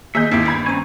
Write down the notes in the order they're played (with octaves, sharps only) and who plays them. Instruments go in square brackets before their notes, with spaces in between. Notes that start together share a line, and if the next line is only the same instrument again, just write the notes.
[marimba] D#3 A#3 [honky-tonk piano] G#4 D#5 G6 [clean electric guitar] E5
[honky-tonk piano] G#1 D#2 E4 [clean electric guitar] G4 G#4 E5
[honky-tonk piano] G1 B5 G#6
[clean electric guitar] G2 C4 G#5 [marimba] C#4 A#5